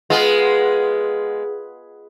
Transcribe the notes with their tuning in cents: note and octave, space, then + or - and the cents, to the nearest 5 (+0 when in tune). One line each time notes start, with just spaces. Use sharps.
G#3 +5 B3 +0 F4 +0